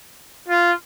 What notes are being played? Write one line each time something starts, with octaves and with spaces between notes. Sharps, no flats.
F4